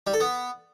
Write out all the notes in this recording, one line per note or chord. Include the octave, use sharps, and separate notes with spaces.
G3
A4
B3